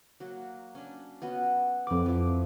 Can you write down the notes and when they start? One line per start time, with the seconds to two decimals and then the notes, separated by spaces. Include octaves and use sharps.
0.20 F#3 A#3 F#4
0.75 C#4 D4
1.22 B3 C#4 F#4
1.87 F2 C4 B4 D6
2.06 F3 E4